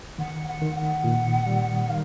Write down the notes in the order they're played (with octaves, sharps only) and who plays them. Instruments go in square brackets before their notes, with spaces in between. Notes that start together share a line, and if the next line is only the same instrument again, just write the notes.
[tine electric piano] D#3 [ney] F#5
[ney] F#5
[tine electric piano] D#3
[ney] F#5
[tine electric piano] A#2
G3
[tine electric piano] D#3 [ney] F5